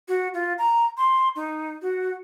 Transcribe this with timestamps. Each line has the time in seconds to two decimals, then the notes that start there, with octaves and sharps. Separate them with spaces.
0.08 F#4
0.34 F4
0.58 A#5
0.97 C6
1.36 D#4
1.82 F#4